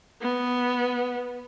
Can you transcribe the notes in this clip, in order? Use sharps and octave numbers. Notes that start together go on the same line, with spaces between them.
B3